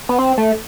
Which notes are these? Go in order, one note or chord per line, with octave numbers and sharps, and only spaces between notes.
B3
C4
A3